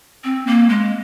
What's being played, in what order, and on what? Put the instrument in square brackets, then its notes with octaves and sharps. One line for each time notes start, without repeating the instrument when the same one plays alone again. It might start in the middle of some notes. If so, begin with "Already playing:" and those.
[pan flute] C4
A#3
G#3